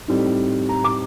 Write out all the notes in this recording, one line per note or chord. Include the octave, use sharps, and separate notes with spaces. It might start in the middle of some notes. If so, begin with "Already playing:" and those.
A2 G3 C4 D#4
A#5
D6